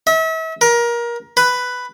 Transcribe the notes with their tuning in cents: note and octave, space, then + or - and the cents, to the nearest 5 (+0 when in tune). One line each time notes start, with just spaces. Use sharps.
E5 -35
A#4 +25
B4 +5